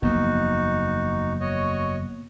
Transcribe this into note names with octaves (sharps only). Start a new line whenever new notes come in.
F#1 E2 F3 A#3 B3 D#4 F#4
F#4 C#5 D#5